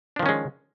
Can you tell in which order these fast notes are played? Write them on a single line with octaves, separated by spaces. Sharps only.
D4 F3 D#3 C#4 G#3